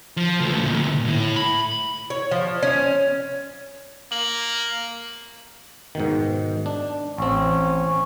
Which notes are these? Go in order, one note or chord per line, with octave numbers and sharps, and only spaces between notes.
F3
C#2 A3
D2 A#2
A2 E4
B5
C#5
F3
C#4
A#3 F#7
G#2 B2 D#3
D4
A1 C4 C#4